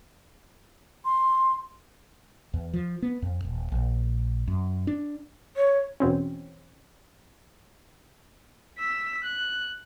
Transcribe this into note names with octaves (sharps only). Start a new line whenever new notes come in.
C6
E2
F3
B3
F2
D#1
A#1
F#2
D4
C#5
E2 B2 C4 C#4
E6 B6
F#6